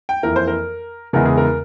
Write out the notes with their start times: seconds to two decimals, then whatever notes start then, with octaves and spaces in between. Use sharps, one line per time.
0.09 G5
0.23 F2 E3 A#3 E4 A#4
0.36 C5
0.47 A#4
1.13 E2 C#3 E3 G#3 E4 A#4
1.25 G#4
1.38 A#4